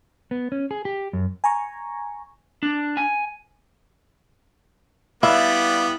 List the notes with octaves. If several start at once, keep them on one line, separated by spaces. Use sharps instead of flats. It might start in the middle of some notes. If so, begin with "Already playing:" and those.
B3
C#4
G#4
G4
F#2
G#5 A#5 C#6
D4
G#5
G3 B3 E4 D5 F5